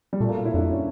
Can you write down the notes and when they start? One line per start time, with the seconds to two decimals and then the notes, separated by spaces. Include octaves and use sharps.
0.13 G3
0.20 A#2 A3
0.29 A#3
0.37 F4
0.45 E4
0.54 F2 D4
0.71 C#4